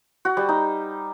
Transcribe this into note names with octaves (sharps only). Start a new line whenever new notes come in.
F#4
G3
D#4